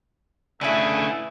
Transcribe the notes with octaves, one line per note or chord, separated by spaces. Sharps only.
D3 A3 C#4 E4 G#4 B4 E5